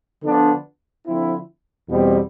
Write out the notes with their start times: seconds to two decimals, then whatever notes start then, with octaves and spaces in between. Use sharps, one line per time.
0.22 D3 F3 B3 D4
1.05 D3 F3 C4 E4
1.88 E2 B2 G3 C4